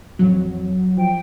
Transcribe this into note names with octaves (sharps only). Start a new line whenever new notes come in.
A1 F2 F#3
F3 G5